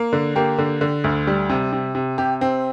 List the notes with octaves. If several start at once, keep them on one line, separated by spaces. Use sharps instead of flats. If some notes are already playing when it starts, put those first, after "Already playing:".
Already playing: A#3
D3
A#3 G4
D3
D3
D2
G3
C3
C3
C3
C3 G4
C4